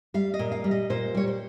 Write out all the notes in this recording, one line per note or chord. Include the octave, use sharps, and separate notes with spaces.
G3 F5
D#5
A#2
F5
G3
D#5
A#2 C5
G3 C#5
C5